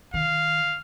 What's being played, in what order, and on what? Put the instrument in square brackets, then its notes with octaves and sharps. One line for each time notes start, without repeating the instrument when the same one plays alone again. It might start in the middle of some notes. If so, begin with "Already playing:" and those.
[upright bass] D#3 [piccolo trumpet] F5